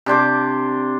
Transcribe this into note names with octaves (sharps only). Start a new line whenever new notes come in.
C3 D4 C5 D6